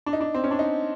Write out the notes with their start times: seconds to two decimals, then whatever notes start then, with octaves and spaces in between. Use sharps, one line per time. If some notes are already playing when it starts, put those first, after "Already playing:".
0.06 D4
0.13 D#4
0.21 D4
0.34 C4
0.44 C#4
0.51 D4
0.59 D#4